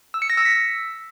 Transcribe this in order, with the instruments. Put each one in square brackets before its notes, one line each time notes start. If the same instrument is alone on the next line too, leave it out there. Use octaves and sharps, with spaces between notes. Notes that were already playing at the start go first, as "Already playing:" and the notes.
[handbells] E6
C#7
A#6
E6
B6